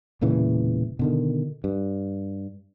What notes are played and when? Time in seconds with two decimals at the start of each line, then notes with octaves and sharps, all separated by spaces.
0.21 E1 A#2 C#3 E3
0.99 B2 D3 D#3
1.64 G2